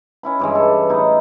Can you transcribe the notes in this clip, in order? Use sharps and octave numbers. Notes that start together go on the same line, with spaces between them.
C#4 E4 B5
G2 E3 G#3
A4
A2 D#4 E4